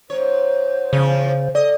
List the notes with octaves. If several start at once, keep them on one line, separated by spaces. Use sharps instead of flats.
G#2 C5 C#5
E2 C#3 F3 C#4
A4 D5 D#5